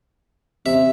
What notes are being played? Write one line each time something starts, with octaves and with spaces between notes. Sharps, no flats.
C3 E5